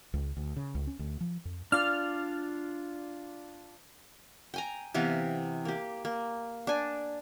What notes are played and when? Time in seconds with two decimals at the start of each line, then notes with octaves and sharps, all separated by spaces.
0.14 C#2
0.37 D2
0.56 C#3
0.75 C#2
0.87 C#4
0.99 D2
1.21 F3
1.45 F2
1.72 D4 F4 D5 F6
4.54 G5 G#5 A#5
4.94 C3 E3 B3 F5
5.65 A#3 G4
6.05 A#3
6.67 D4 G#5